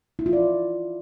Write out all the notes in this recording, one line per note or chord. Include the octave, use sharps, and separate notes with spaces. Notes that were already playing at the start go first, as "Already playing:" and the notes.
E4
F4
D5